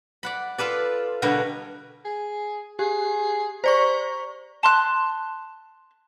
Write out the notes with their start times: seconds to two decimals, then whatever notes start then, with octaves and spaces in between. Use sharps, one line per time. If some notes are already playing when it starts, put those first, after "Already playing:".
0.23 D5 F#5 B5
0.58 F4 A4 B4 D5
1.22 B2 D3 G3 A#4 B4 C#5
2.05 G#4
2.79 G4 G#4
3.64 C5 D5 A#5 C#6
4.63 A5 C6 F#6